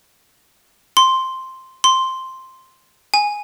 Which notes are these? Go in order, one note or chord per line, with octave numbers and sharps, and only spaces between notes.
C6
C6
G#5